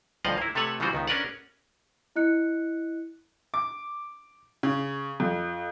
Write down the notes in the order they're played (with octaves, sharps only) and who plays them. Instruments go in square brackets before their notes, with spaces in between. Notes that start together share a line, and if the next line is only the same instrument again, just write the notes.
[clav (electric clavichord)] D2 G2 F3 D#5 F5 F#5
A#3 E4
C3 A3 A4 B4 C#5 F#5
C#3 E3 G3 F4 F#4 C5
C#2 D#3 B3
C#4 D4 A#4 B4 D5 F#5
[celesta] E4 D#5 F#6 C#7
[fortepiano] D6
C#3
F2